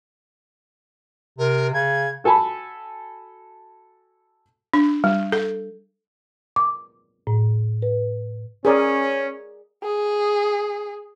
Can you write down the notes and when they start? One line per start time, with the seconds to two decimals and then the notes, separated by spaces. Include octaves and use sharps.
1.38 C3 A#4
1.73 C#3 G#6
2.24 F#4 A4 G#5 A5 B5
4.74 D4
5.04 G3
5.32 A4
6.56 D6
7.27 A2
7.82 B4
8.65 C#4 G#4 A#4 D5
9.83 G#4